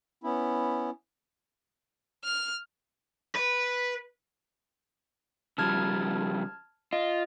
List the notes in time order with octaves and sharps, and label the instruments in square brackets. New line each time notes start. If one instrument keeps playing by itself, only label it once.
[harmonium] B3 C#4 E4
[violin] F6
[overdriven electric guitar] B4
[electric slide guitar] C#3 F3 G3 [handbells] A5 F6 G#6
[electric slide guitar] F4 [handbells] D#5